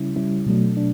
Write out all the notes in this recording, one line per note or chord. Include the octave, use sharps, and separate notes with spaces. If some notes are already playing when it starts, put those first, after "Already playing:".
Already playing: C#3 G3 C#4 E4
C#3 G3 C#4 E4
B2 F#3 A3 D4
D4